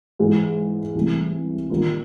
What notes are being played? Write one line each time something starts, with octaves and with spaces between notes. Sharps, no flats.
G#2 E3 G#3
C2 C3 E3 A3
D#3 G3 A#3 D4 F4